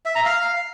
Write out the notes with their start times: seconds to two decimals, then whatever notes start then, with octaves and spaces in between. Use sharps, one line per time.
0.05 E5
0.15 A#5
0.25 F5